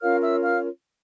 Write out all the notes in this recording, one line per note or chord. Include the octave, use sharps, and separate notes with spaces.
C#4 F4 A#4 C#5 F5 F6
E5 E6
F5 F6